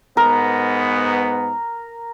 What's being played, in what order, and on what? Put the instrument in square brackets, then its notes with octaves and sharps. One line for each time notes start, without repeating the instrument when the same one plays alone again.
[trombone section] G#2 B3 [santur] A#4